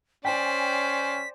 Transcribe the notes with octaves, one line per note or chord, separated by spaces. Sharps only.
C#4 C5 D5 G5 G#5 B6